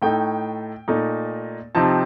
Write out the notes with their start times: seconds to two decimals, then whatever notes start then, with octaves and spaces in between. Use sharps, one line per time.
0.02 A2 A3 D#4 G5
0.88 A#2 A3 D#4
1.75 C3 F3 C4 D#4 A5